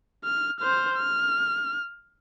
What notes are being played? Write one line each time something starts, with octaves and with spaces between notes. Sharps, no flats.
F6
C5 F6
F6